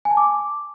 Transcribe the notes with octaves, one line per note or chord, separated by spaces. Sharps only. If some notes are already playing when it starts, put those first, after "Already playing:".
G#5
A5
D6